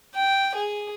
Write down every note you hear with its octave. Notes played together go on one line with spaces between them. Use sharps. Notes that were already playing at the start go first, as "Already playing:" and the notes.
G5
G#4